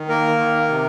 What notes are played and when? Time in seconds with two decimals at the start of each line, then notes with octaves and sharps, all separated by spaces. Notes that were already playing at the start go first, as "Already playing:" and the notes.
Already playing: D#3
0.09 A#3 A#4
0.38 D#3
0.69 C3